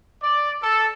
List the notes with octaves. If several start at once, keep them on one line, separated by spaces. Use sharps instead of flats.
D5
A4